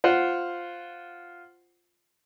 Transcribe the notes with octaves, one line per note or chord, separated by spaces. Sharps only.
F4 C5 F#5